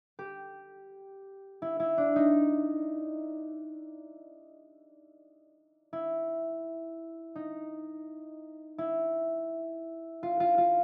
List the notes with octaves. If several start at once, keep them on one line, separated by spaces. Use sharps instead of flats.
G4
E4
E4
D4
D#4
E4
D#4
E4
F4
F4
F4